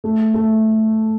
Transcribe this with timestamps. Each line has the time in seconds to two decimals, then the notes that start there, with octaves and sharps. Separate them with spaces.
0.04 A3
0.34 A3